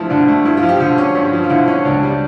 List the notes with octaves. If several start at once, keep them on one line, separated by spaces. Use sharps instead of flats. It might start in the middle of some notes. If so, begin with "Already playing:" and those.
Already playing: G2 F3 A3 E4
D3 D4
A3
G2 E4
F4
F3
G4
D3
C#4
G2
F3
F4
D3 E4
C#4
C#2 D4
G3